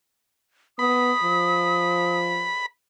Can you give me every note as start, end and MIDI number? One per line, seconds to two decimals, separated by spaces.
0.79 1.12 59
0.79 2.66 83
0.79 2.19 87
1.23 2.51 53